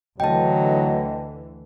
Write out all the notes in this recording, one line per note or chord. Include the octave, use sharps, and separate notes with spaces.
D2 D3 E3 F#3 D#5 G5 A5